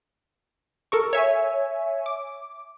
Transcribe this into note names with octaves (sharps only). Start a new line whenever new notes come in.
A4 A#4 C#6
C#5 E5 G#5
D6